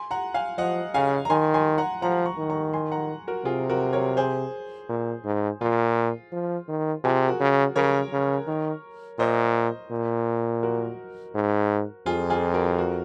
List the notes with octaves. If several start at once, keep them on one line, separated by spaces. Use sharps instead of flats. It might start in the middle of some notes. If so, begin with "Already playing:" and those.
Already playing: G#5 C6
F#5 A#5
F5 G#5
F3 D#5 F#5
C#3 F5 G#5
A#5
D#3 G#5 C6
G#5 C6
F#5 A#5
F3 F#5 A#5
A#5 C#6
D#3
A#5 C#6
G#5 C6
F#5 A#5
F#4 A#4
C3 F4 G#4
F#4 A#4
A#4 C#5
G#4 C5
A#2
G#2
A#2 F4
F3
D#3
C3 F4 G#4
F#4 A#4
C#3
C#3 A#4 C#5
C#3
D#3
A#2 C5 D#5
A#2
F#4 A#4
G#2
F2 F4 G#4
F4 G#4
F#4 A#4
F#4 A#4